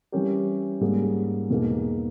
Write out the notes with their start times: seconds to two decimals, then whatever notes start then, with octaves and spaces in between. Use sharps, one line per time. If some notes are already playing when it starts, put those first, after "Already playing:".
0.12 E3 G3 C#4 G4 A#4
0.81 G#2 G3 A#3 C#4 G#4
1.50 E2 B2 A#3 D#4 G#4